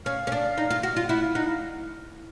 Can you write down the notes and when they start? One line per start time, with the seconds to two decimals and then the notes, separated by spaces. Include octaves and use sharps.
0.06 C#4 F5
0.27 C#4
0.32 D4
0.58 D#4
0.70 F4
0.83 F#4
0.96 F4
1.09 E4 F#5
1.23 F5
1.35 D#4 F#5
1.48 F5